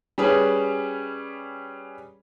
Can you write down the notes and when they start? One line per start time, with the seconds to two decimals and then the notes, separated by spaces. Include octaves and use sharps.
0.18 G3 C#4 G#4 B4